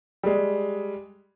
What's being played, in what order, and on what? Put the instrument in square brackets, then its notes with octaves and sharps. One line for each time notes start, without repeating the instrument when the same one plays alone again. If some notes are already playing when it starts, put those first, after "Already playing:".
[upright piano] G3 G#3